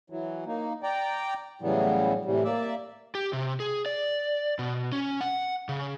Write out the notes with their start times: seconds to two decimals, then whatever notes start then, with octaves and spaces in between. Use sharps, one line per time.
0.10 E3 F#3
0.46 A#3 D#4
0.83 D5 G5 A#5
1.62 A2 C#3 E3 F#3 G3 B3
2.25 A2 C3 E3 G3
2.44 A#3 D5 E5
3.15 G4
3.33 C3
3.60 G#4
3.86 D5
4.59 B2
4.92 C#4
5.21 F#5
5.69 C#3